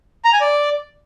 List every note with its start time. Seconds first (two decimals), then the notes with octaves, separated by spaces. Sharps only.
0.25 A#5
0.33 G#5
0.41 D5